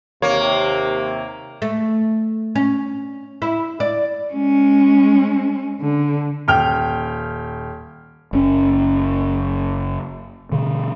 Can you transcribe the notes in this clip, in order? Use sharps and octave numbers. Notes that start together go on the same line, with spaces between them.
D#2 C3 A#3 C#5
A3
C#4
E4
D5
G#3 C#4
D3
D#1 G5 F6 F7
F#1 C#4
B2 D3